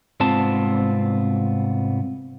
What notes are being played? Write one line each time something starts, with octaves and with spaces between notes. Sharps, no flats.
C2 G#2 B3 C4 F4 A5